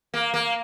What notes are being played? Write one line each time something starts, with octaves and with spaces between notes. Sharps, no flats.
A#3
A#3